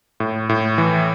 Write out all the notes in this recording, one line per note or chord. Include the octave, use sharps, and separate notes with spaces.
A2
A2
E3